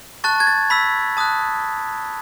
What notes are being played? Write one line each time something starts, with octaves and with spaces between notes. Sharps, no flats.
A5 C#6 F#6 A6
G#6
A6
B5 E6 B6
A5 D#6 F#6